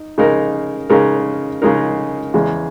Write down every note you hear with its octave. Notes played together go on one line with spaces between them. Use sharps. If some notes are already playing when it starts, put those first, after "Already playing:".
Already playing: D#4
C#3 G#3 D#4 A#4
C#3 G#3 D#4 A#4
C#3 G#3 D#4 A#4
E2 C#3 G#3